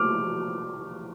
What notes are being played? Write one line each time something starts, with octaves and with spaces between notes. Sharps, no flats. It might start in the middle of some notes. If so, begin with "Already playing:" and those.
Already playing: D6 F6